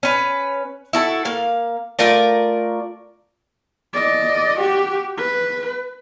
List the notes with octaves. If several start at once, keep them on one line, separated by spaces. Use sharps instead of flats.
C#4 B4
E4 F#4 A4
A#3 F5
A3 F4 A#4 D5
D5 D#5
F#4 G4
B4